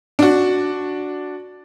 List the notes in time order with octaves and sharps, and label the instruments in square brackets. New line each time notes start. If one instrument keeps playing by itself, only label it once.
[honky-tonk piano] D4 F#4